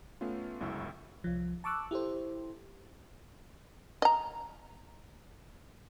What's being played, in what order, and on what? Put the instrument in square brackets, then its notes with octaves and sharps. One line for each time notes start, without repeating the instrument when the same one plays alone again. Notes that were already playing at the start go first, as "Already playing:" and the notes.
[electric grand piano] A3 B3 C#4 F4
G1 C#2 F#2 E4 C#6 E6
[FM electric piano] C2 F3
A5 C#6 D6 E6 F#6
E4 G4 A4 C5
[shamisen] D#5 A#5